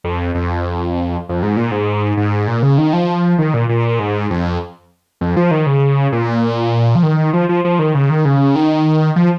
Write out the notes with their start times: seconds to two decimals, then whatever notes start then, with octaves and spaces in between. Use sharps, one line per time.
0.04 F2
0.35 F2
1.29 F2
1.43 G#2
1.57 A#2
1.71 G#2
2.17 G#2
2.47 A#2
2.62 C#3
2.78 D#3
2.93 F3
3.38 D#3
3.54 A#2
3.69 A#2
3.99 G#2
4.30 F2
5.21 F2
5.37 F3
5.51 D#3
5.66 C#3
6.12 A#2
6.95 F3
7.03 D#3
7.33 F3
7.49 F3
7.64 F3
7.79 D#3
7.95 C#3
8.10 D#3
8.25 C#3
8.55 D#3
9.16 F3